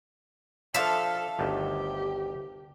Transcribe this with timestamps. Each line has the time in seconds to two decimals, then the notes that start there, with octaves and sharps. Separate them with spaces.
0.74 F3 D4 A4 E5 F5
1.39 G1 D2 D#3 G4